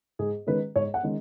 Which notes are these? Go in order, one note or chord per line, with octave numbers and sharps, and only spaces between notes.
G#2 G#4
D#3 G#3 C#4 B4
G#2 C#5
F#5
D#3 G#3 C#4